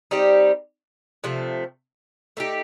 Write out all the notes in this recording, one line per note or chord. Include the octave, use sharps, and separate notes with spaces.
G3 C4 D#4 G4
C3 F3 A3
A3 D#4 G4